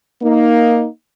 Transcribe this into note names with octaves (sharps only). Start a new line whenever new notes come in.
A#3 D#4